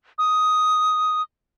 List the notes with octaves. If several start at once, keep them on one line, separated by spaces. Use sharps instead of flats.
D#6